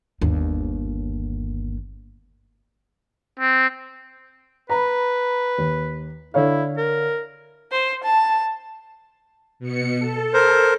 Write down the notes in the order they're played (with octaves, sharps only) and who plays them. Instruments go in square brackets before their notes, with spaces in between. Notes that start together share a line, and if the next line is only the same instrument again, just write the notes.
[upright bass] G1 D#2
[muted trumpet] C4
[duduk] B4 [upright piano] A#5 B5
[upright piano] D#2
[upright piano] D3 C#5 F5 [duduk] E4
[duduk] A#4
[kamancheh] C5
A5
[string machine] B2 C#7
A4
[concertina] A#4 C5